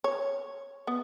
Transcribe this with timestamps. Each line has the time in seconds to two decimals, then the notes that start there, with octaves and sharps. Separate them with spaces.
0.04 C#5
0.87 B3